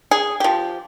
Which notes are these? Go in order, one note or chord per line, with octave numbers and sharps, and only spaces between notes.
G#4
F3 G4